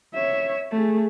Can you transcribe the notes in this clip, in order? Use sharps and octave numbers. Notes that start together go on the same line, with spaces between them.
C#5 E5
A3 G#4